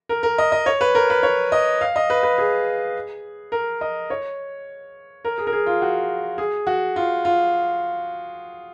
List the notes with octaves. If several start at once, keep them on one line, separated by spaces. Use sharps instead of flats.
A#4
A#4
D#5
D#5
C#5
B4
A#4
B4
C#5
D#5
F5
D#5
B4
B4
G#4
A#4
D#5
C#5
A#4
G#4
A#4
G#4
F4
F#4
G#4
F#4
F4
F4